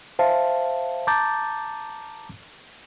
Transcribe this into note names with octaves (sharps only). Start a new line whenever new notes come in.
C5 E5 F5 A5
A5 A#5 D6 G6 A6